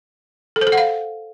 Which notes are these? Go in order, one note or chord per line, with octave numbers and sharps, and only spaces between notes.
A4
C5
A4
F#5
F5